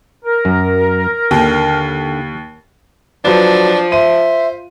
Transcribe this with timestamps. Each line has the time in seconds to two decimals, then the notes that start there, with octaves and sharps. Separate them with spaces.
0.25 A#4
0.45 F#2
1.31 D#2 D3 G5
3.25 F3 F#3 D4 B4
3.92 C5 E5 D#7